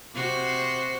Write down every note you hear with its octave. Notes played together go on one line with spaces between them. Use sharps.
C3 F#4 C5